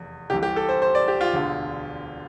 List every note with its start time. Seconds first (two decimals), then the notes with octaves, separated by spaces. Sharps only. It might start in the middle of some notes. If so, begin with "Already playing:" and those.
Already playing: F1 E2
0.30 C2 C3 E3 G4
0.43 G4
0.56 A4
0.69 C5
0.82 C5
0.95 D5
1.08 G4
1.21 F4
1.33 E1 D2 D3